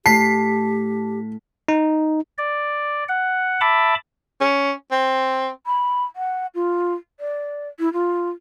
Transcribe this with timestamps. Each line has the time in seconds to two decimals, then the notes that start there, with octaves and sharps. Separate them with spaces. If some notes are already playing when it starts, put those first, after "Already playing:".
0.06 A2 G4 A5 B6 C7
1.68 D#4
2.38 D5
3.09 F#5
3.61 E5 A5 B5 D6
4.41 C#4
4.92 C4
5.66 B5
6.16 F#5
6.55 F4
7.20 D5
7.79 E4
7.93 F4